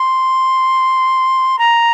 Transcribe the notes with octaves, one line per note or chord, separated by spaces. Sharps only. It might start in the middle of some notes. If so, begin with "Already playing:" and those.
Already playing: C6
A#5